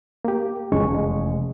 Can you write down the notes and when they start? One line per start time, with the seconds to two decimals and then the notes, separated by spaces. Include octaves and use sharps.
0.25 A#3 G4
0.72 F1 E2 C#3 G#3 C#4 C#6
0.94 G#3